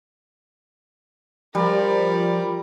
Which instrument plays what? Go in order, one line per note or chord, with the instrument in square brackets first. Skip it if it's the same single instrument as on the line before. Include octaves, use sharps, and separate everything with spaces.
[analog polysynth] F3 [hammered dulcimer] G3 [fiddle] A#4 D5